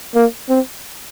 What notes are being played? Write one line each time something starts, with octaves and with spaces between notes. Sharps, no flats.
A#3
C4